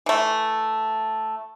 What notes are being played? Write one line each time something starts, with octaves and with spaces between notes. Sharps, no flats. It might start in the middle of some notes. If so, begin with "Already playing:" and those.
E3 A3